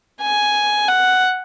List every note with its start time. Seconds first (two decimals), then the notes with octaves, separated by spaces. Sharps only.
0.21 G#5
0.88 F#5